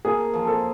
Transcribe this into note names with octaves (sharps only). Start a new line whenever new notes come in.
A#3 G#4
F3
A4